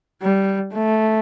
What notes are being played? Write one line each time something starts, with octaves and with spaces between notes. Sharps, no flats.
G3
A3